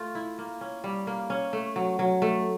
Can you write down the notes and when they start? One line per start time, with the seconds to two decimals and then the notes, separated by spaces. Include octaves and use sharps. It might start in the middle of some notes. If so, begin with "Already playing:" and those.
Already playing: A3 F4
0.15 E4
0.38 A#3
0.61 C#4
0.84 G3
1.07 A#3
1.30 C#4
1.53 A3
1.76 F#3
1.99 F#3
2.22 A3